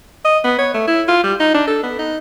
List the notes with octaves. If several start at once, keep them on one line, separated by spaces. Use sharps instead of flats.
D#5
B3
C#5
A3
E4
F4
G3
D#4
D4
A4
B3
D#4